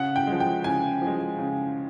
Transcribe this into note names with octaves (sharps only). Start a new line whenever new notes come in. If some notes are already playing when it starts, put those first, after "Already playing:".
Already playing: C#3 F#5
G5
F3 G#3
G5
C#3 G#5
F3
G#3
C#3